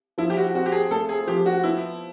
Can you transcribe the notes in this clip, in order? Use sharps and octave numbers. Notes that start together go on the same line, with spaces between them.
F3 E4
G4
F#4
C4 F#4
G4
G#4
A3 A4
G#4
F3 G4
F#4
B3 E4